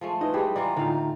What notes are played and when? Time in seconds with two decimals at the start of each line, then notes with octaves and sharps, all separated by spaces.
0.01 F3 G#3 A3
0.21 D#4 E4 B4 D#5
0.34 G3 G#3 G4 G#4
0.56 E3 F4 D5 A#5
0.77 A2 D3 D#4 F4 F5